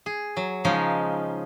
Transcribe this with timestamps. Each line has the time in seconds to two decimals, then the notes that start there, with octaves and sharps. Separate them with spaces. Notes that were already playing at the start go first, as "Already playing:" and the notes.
0.06 G#4
0.37 F#3
0.64 C#3 F3 G#3 C#4 D#4